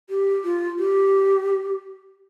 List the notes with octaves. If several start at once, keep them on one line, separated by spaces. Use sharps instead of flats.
G4
F4
G4